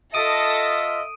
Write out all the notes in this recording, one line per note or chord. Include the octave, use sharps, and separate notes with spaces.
F4 A4 D#5 E5 D#6 A#6 D7 D#7